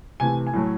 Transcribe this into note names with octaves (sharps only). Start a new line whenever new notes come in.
C3 E3 A3 G#5
G#5
A2 F#3 A3